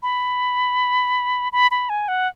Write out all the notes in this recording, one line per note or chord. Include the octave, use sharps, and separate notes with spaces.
B5
B5
B5
G#5
F#5